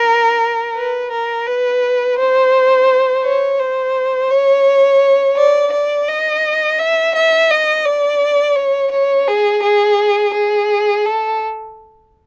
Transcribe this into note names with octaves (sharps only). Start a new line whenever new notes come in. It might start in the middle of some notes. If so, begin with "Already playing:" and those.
Already playing: A#4
B4
A#4
B4
C5
C#5
C5
C#5
D5
D5
D#5
E5
E5
D#5
D5
C#5
C#5
G#4
G#4
G#4
A4